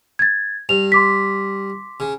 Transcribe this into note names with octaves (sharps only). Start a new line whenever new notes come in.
G#6 A6
G2 F7
C6 D6 B6
C#3